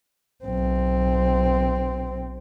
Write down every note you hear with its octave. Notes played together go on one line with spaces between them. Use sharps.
B1 C4